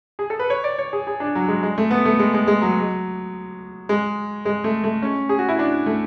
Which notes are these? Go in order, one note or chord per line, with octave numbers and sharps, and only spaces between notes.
G#4
A4
B4
C#5
D5
C#5
G#4
G#4
D4
F#3
G#3
G#3
A3
B3
A3
G#3
G#3
G#3
F#3
G#3
G#3
A3
A3
C#4
G#4
F#4
E4
D4
A3